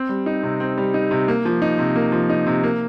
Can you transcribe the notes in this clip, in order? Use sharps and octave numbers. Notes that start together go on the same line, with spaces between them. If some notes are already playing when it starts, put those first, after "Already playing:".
Already playing: C4
G3
D#4
C3
C4
G3
D#4
C3
A#3
F3
D#4
C3
A#3
F3
D#4
C3
A#3